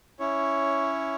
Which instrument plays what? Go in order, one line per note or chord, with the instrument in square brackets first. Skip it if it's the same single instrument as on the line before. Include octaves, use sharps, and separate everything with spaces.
[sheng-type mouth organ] C#4 E4 C#5